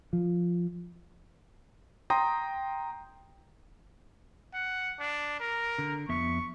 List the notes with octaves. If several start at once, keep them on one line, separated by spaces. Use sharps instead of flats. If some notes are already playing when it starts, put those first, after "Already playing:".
F3
G5 A#5 C6 D#6 A#6
F#5
D4
A#4
D3
F2 B3 E5 C#6